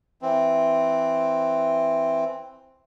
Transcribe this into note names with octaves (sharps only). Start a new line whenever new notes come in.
E3 C4